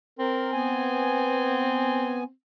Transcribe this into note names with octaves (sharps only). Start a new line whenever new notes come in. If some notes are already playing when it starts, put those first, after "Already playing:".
C4 A#4
B3 G#5